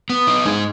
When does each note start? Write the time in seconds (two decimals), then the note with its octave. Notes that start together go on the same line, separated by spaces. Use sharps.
0.10 B3
0.27 D#4
0.45 G#2 G#3